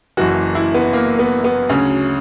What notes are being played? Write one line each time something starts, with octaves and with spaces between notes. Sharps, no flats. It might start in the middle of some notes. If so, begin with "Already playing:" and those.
F#1 F#2 E3 F#4
E4
B3
A#3
B3
B3
D2 C#3 F#3 C#4